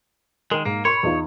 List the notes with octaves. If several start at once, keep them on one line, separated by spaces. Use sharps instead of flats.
D#3 G#3 A#4
G#2 A#3
A#4 C#5 B5 C6
E2 D#4 F4